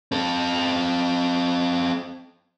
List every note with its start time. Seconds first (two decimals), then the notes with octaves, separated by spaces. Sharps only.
0.12 C4 A4